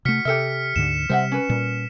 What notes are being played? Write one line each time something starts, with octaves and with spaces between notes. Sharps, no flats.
C3 A3 F#4 F6 B6 C#7
C3 G4 A4 E5 F6 C#7
D2 G#2 D3 E7
C3 G3 C5 E5 F#5
C#4 B4
A#2 G3